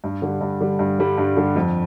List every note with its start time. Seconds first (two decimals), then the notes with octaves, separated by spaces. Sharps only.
0.04 G2
0.22 D3
0.27 G3
0.41 G2
0.61 D3 G3
0.79 G2
0.99 D3 G3
1.18 G2
1.37 D3 G3
1.56 F2